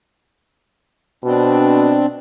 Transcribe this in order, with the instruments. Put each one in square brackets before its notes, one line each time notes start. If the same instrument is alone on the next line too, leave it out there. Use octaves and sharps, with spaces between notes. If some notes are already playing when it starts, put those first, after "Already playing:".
[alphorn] B2 [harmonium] C4 D4